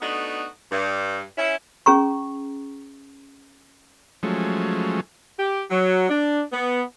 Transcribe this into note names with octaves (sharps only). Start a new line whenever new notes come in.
A3 B3 D4 D#4 F#4
G2
C#4 E4
C#4 G#4 A#5 C#6
F3 F#3 G#3 A3 C#4
G4
F#3
D4
B3